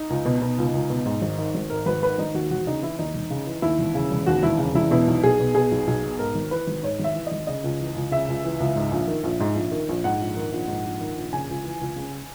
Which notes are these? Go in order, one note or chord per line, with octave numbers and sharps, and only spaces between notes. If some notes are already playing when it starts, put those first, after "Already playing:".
Already playing: D#4
C#2
B2
B2
C#2
C#2
B2
G#2
G#1
D#3
G#1
G#2 A#4
G#1 B4
D#3 B4
G#1 D#4
D#2 F#4
E1 F#4
C#3 D#4
E3 E4
D#2 D#4
E1
C#3
E3
D#2 E4
E1
C#3
E1
D#2 F#4
E1 E4
C#3
E1 E4
B2 E4
B1
B1 G#4
B2
B2 G#4
B1
B1
B2
G#2 A#4
G#1
E3 B4
G#1
G#2 C#5
G#1 E5
E3
G#1 D#5
C#3 D#5
C#2
E3
C#2
C#3 E5
C#2
E3
C#2
G#2
A#1
D#3
A#1
G#2
A#1
D#3
A#1
G#2 F#5
A#1
D#3
A#1
G#2
A#1
D#3
A#1
C#3 G#5
C#2
E3
C#2
C#3